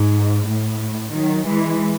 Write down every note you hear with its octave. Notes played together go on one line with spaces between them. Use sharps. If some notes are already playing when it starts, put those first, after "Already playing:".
Already playing: G#2
A2
D#3 F#3
E3 G#3